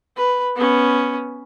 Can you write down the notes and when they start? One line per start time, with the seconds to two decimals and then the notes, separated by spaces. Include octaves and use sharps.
0.16 B4
0.56 B3 C#4